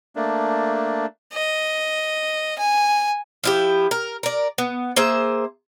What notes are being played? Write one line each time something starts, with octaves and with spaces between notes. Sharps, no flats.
A3 A#3 D4
D#5
G#5
F3 E4 G4
A#4
A#4 D5
B3
A#3 G#4 C5 E5